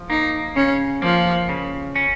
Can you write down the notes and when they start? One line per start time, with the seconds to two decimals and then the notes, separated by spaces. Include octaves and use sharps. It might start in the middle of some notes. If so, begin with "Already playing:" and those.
Already playing: F3
0.10 A#3 D#4
0.56 C#3 C#4
1.02 F3 A#3
1.49 C#3
1.96 C#4